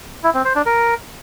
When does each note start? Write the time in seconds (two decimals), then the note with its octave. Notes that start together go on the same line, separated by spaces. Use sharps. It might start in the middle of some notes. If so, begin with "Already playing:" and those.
0.23 E4
0.34 C4
0.45 C5
0.55 D4
0.66 A#4